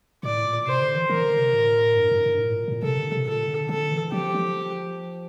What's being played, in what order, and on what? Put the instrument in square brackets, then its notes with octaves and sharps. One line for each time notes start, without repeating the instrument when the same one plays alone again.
[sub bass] A2 [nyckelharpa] D5
[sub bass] A#2
[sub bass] C3 [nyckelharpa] C5
[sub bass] D3
E3
[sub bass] E3 [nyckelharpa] A#4
[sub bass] D3
C3
A2
G2
G2
G2
A2
A#2
A#2
[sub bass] C3 [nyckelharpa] A4
[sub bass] D3
C3
[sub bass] A#2 [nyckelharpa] A4
[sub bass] D3
[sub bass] D3 [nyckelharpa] A4
[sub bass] E3
[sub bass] F3 [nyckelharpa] G4
[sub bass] F3